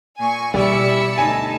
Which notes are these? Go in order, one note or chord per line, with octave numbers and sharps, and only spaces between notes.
A#2 G#5 C#6
B2 G3 E4 D5 E5 C#7
D2 D#4 G#5 A5